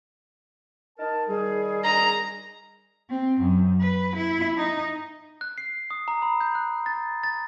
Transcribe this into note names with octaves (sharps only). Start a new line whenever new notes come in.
D#4 A#4 A5
D#3 G3 G#4
A#5
C4
F#2
B4
E4
D#4
F#6
C7
D#6
A#5
B5
G6
F#6
A6
A6